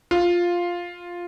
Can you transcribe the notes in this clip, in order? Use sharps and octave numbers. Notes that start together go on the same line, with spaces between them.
F4